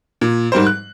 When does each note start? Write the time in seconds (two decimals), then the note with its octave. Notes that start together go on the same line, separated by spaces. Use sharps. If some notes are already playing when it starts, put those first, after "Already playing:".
0.21 A#2
0.52 G#2 G3 A#4 C5
0.67 F#6